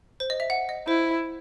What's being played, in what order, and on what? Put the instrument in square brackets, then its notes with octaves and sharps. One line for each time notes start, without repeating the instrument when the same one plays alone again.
[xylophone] C5
D#5
E5
F#5
D#5
[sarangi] E4 [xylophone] C5